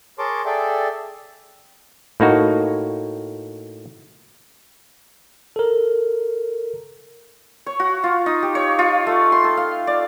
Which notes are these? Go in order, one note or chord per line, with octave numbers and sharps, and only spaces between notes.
G#4 A#4 C#5 A5 C6 D6
G#4 A4 D5 E5 G5
A2 A#3 D#4 F#4
A4 A#4
C#5
F#4
F4
D#4
G4
C#5
F4
A3
C6
A4
F5
D5